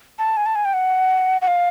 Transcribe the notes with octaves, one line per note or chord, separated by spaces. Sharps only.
A5
G#5
A5
G#5
G5
F#5
F#5
F5